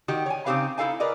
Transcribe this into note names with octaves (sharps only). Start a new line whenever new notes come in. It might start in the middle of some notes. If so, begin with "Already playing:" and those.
D#3 F#4 G4
C#5 G#5
C#3 C4 D#4 G4 B4 F5
D#4 E4 A4 F5 G#5
A#4 B4 D5 D#5